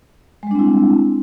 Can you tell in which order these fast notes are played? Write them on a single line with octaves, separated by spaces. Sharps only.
G#3 G3 D4 C4 E4